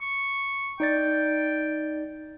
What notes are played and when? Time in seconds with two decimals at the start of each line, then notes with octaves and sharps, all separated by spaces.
0.01 C#6
0.80 D#4 D5 G5 A6